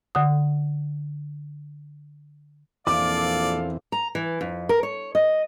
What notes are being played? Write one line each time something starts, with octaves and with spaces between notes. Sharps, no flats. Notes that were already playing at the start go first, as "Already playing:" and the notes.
D3 F#5 D#6
A#1 E2 E3 C4 A4 D5 F5 D6
A#5
E3
F2
A#4
C#5
D#5